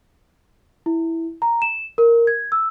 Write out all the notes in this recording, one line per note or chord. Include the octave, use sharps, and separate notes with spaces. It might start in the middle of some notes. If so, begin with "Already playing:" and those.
E4
A#5
E7
A#4
G#6
E6